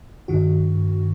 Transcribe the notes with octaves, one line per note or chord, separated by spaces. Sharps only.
G2 D#3 F#4